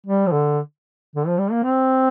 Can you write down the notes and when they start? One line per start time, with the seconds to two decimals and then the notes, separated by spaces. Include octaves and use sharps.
0.06 G3
0.27 F3
0.32 D3
1.16 D3
1.27 F3
1.39 G3
1.52 A#3
1.63 C4